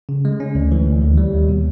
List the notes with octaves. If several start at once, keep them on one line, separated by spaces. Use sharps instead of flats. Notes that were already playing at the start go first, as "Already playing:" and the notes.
C#3
G#3
C#4
D2
E3
D2
D#2
G3
D#2
B2